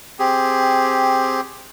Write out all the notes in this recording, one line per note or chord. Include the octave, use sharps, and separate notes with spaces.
C4 G4 G#4